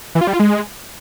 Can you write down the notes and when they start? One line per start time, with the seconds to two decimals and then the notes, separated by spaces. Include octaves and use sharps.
0.15 E3
0.21 F4
0.27 G3
0.33 F4
0.40 G#3